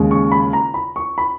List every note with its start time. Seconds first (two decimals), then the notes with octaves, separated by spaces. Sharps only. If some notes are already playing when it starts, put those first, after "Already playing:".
Already playing: D#2 C#3 G#3
0.11 C#6
0.32 B5
0.53 A#5
0.74 B5
0.96 C#6
1.18 B5